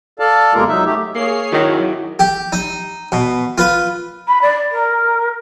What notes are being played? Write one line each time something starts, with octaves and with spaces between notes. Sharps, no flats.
A4 D5 F5 A5
E2 C3 G#3 A#3 F4 A#4
F#3 D#4 E5
A3 G4
A#3 G#4 C#5 C7
D#3 F#3 E4 F#4 G4
G4
D#4
B2
F4 B4
B5
D5
A#4